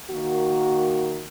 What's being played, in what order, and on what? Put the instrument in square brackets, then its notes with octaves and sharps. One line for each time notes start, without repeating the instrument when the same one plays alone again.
[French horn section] D#3 A#3 F#4